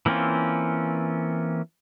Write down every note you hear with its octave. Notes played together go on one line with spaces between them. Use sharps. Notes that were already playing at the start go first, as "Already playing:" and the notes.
E3 A#3 C4 C#4 F4